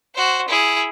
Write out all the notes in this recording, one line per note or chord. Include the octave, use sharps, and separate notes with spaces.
F#4 C5
E4 G#4